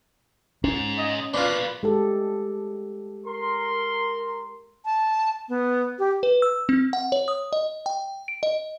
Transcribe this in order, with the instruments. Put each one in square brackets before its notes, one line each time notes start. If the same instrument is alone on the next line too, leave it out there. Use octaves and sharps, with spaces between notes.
[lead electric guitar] G#2 [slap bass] C#4
[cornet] D#5
[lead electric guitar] B2 A#3 [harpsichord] D4 F4 [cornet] B4
[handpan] G#3 G4 A4
[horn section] A#4 C6
[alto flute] A5
B3
G4
[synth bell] B4
E6
C4
F#5
C#5
D#6
D#5
G5
D7
D#5